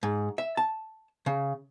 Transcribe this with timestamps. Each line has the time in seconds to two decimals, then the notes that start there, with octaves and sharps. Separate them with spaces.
0.03 G#2
0.38 E5
0.57 A5
1.26 C#3